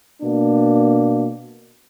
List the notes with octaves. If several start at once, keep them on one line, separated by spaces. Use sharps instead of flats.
B2 A#3 D4